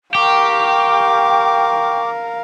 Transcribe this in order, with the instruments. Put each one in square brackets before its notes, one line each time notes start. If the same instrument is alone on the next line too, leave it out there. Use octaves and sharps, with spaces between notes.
[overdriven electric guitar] G4 [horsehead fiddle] A#4 F5 [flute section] G5 C#6 [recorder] D6